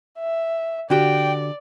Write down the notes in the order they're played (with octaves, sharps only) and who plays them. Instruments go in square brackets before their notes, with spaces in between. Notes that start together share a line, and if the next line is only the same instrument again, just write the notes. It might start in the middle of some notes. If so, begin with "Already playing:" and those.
[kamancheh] E5
[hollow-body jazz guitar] D3 F#4 G4 [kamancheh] D5 [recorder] G5